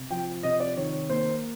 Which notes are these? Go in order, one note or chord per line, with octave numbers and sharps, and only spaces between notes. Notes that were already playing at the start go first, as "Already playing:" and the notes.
Already playing: C3
F3 G5
C3 D#5
D5
D#3 C#5
A#3 C5